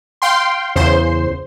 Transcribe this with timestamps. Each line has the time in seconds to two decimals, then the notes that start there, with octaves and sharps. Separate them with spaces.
0.22 F5 G5 C6
0.76 E2 C#3 C5 C6